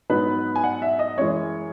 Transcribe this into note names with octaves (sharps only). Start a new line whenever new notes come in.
G#2 F#3 B3 D#4 B4
G#5
F#5
E5
D#5
F#2 E3 G#3 C#5